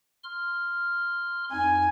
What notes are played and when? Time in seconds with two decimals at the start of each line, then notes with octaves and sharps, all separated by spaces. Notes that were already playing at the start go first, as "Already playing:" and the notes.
0.24 C6 F6
1.52 F2 D#4 G#5